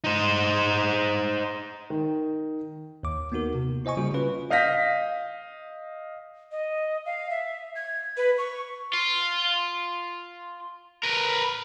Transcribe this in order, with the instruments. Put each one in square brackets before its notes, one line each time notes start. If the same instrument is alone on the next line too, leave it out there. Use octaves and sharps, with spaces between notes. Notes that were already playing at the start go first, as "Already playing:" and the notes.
[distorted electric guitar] D#4 C5
[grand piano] D#3
[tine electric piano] D#2 D6
A#3 B3 D#4 F#4 A#4
C3
E4 C5 D#5 G#5 C#6
C#3 G3 A#3 F4 F#4
C#4 F4 B4
[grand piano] D#5 F5 G6 A#6 B6
[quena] D#5
F5
E5
G#6
B4
C#6
[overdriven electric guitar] F4
A#4 B4